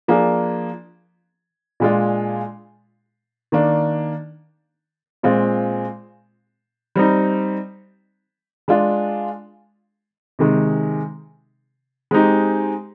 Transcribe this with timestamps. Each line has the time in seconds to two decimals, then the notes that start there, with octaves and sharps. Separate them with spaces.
0.08 F3 A#3 D4 G#4
1.80 A#2 G#3 D4 F4
3.52 D#3 A#3 D4
5.23 A#2 G#3 C4 F4
6.96 G3 C4 D#4
8.68 G#3 D4 F4
10.39 C3 D#3 G#3
12.11 G#3 C4 D#4 G4